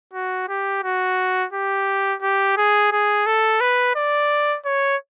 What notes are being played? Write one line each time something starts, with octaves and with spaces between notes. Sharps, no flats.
F#4
G4
F#4
G4
G4
G#4
G#4
A4
B4
D5
C#5